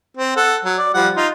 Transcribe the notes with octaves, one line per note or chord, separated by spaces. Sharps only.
C4
A4 F#5
F#3
D5
F3 G3 F#5
D#4 F4